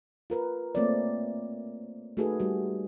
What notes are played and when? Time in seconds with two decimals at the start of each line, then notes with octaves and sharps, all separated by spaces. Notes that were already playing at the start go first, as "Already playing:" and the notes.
0.30 F4 A#4 B4
0.75 A3 A#3 C4 F4 C#5 D5
2.17 A3 D#4 F#4 G#4 A4 B4
2.40 G3 F#4